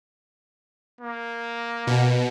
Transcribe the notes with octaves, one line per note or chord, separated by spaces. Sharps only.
A#3
B2